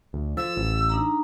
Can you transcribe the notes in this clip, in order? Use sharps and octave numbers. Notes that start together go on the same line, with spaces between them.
D2
F3 A4 E6
A1
D4 D#4 A#5